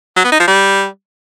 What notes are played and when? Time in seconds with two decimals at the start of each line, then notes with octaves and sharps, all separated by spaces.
0.16 F#3
0.24 B3
0.32 D#4
0.40 F3
0.48 G3